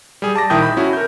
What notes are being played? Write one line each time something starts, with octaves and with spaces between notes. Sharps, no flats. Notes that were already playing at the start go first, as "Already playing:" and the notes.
G3 G#4
A5 D6 A#6
A#1 D#3 E4 G5 D#6 G6
B5
C#4 E4 F#4
A#4 G6